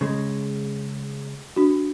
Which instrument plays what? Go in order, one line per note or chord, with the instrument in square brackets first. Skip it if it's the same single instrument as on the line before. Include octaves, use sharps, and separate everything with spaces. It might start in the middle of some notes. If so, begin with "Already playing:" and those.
[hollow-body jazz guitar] C#3 G#3
[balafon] D4 F#4